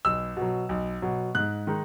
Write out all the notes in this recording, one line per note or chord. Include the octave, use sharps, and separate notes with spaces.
B1 E6
B2
F#3
B1
B2 F#3
G#2 F#6
D#3 G#3 D#4